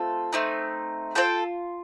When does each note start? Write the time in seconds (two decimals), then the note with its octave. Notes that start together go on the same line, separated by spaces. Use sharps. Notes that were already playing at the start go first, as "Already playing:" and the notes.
Already playing: A3 C4 F4 A4
0.33 A3 C4 D#4
1.15 C4 F4 A4 G5